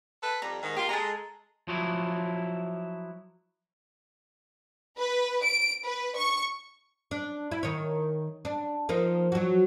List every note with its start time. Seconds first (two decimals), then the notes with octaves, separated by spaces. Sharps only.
0.22 A4 B4
0.42 F2 G3 A#5
0.62 G#2 D#3
0.76 A#3 F4 G4
0.89 G#3 A4 A#5
1.68 F3 F#3 E4
4.99 B4
5.44 D7
5.85 B4
6.17 C#6
7.11 D4
7.51 E4
7.63 D#3 C#5
8.45 D4
8.89 F3 A#3 D#4
9.32 F#3 F#4